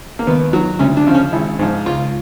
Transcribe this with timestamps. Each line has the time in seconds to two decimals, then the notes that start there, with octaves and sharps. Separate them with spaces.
0.19 A#3
0.27 D#2 B3
0.53 D#3 F#3
0.79 D2 C#4
0.97 D4
1.07 C#3 F3
1.14 C#4
1.32 G#1 E4
1.59 G#2 F3
1.86 C#2 F4